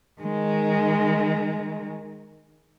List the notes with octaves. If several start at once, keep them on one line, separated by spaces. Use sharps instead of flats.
D#3 G#3